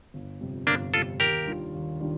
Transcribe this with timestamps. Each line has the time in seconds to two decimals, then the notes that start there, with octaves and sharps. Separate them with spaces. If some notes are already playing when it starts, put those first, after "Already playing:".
0.14 G1
0.41 F2 C3 G3
0.67 G1 A#3 D4
0.94 F2 C3 G3 F4 A4
1.20 D#2 G4 A#4
1.47 D#3 G3 D4 F4
1.74 D#2
2.00 D#3 G3 D4 F4